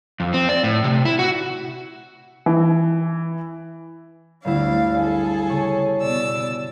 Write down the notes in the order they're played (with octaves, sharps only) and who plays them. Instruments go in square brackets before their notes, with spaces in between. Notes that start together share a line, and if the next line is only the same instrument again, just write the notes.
[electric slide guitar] F2
C4
D5
A2
C3
E4
F#4
[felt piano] E3
[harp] G1 G3 E4 [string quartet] D2 D5 F5
[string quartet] G#4 A4
[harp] C#3 C#6 A6
[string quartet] B2 D5 E6